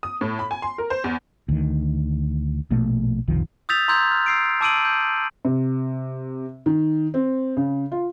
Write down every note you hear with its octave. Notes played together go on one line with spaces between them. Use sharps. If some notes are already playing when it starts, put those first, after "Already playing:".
D#6
A2
B5
G#5
C6
A#4
C5
E2
D2 D#3
A#1 B2 A3 A#3
F#1 C2 D#3 F3
D#6 E6 G6 A6 B6 F7
A#5 C6 D#6 E6 G6 G#6
F6
E6 C7 D7
A5 D6 E6 D7 D#7 F#7
G6
C3
D#3
C4
C#3
F4